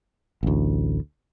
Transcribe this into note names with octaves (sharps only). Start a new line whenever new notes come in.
A1 D2